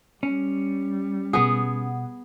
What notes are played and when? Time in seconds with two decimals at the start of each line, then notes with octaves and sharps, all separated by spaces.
0.23 G3 C#4
1.33 B2 B3 G#4 F#5